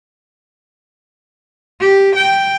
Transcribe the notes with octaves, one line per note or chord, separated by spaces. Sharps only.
G4
G5